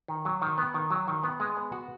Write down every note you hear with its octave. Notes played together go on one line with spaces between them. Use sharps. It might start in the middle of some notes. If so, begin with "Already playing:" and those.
D#3
F#3
D#3
B3
D#3
F#3
D#3
B3
G#3
B3
F#4